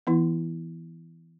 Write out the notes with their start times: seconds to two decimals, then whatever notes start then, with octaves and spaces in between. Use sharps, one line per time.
0.07 E3 B3 E4